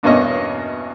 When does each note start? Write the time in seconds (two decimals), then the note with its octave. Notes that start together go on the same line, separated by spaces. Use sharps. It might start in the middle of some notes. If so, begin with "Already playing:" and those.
0.03 E2 G2 B2 A#3 C#4 D#5